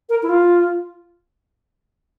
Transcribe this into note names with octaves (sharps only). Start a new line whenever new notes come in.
A#4
E4
F4